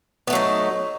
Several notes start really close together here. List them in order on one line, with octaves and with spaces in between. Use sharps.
B3 A3 F#3 D#4